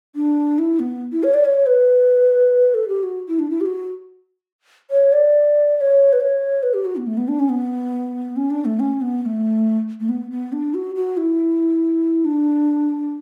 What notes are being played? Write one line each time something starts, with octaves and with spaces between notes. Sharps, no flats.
D4
E4
B3
E4
C#5
D5
C#5
B4
A4
G4
F#4
E4
D4
E4
G4
F#4
C#5
D5
D5
C#5
B4
C#5
B4
G4
F#4
B3
A3
B3
D4
C#4
B3
C#4
D4
A3
C#4
B3
B3
A3
A3
B3
B3
D4
F#4
F#4
E4
D4